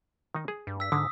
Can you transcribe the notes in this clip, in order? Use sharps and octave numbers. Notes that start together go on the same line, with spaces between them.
D#3 D#4
G#4
G2
E6 B6
G#2 D3 D#6